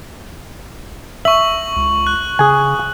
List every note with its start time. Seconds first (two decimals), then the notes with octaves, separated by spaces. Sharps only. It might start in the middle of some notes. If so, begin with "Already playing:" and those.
1.25 E5 C#6 F#7
1.76 C#2
2.07 F#6
2.39 C#3 G#4 G#5